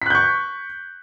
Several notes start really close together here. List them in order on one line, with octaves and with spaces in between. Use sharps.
B6 F#6 G6 C#6